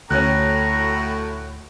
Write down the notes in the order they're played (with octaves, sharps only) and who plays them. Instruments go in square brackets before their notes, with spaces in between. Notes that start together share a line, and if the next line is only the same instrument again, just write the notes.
[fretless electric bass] D2 [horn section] A2 F#4 [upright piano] C#4 F#6 [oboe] A#5